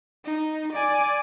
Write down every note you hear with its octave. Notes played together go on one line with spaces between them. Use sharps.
D#4
D5 G#5